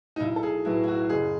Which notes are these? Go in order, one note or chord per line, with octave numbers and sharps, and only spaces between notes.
D#4
B1 E4
A4
G#4
A2 F#3 B3 E4
E4
F#4
F#1 G#4